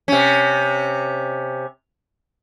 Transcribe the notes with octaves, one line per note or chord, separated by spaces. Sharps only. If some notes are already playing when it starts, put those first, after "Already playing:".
C3 C#4